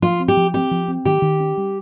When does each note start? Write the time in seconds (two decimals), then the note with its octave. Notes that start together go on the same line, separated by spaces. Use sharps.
0.02 F3 F4
0.20 C4
0.28 G4
0.37 F3
0.54 C4 G4
0.71 F3
0.88 C4
1.05 D#3 G4
1.22 D#3
1.40 C#4
1.57 G3